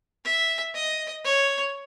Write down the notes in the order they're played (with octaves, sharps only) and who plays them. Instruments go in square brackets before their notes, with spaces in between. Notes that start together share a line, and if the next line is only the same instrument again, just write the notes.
[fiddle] E5
D#5
C#5